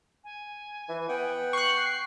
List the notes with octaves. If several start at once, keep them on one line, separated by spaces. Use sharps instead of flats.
G#5
E3
B3 F#5 G5
C#6 F#6 C7